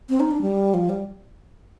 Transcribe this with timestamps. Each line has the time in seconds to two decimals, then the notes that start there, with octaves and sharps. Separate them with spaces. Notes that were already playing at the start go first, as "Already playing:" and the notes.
0.09 C4
0.20 D#4
0.31 D4
0.42 G3
0.74 F3
0.89 G3